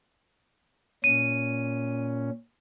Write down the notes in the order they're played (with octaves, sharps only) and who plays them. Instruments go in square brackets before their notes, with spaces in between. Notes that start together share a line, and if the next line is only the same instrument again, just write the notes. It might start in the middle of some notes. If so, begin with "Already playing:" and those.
[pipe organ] A#2 C#4 [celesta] D#7